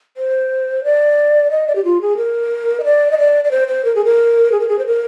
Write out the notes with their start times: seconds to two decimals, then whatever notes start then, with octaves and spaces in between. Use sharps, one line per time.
0.17 C5
0.84 D5
1.51 D#5
1.67 D5
1.75 G4
1.85 F4
2.01 G#4
2.17 A#4
2.80 D#5
2.84 D5
3.11 D#5
3.18 D5
3.44 D5
3.51 C5
3.68 C5
3.84 A#4
3.95 G#4
4.05 A#4
4.52 G#4
4.60 A#4
4.69 G#4
4.79 C5
4.86 A#4